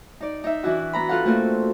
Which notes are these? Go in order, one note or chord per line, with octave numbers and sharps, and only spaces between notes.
D#4 D5
D#4 E5
E3 D4 E4 F#4
B3 A#5 B5
F4 A4 F5 F#5
A3 A#3 C4 F4 F#4 A4